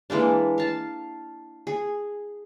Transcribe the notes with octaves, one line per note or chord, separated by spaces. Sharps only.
E3 G#3 A#3 D4
F5 A5
G#4